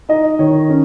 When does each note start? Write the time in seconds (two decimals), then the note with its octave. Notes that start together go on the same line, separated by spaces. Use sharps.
0.09 D#4 D#5
0.39 D#3 C#5
0.70 C#4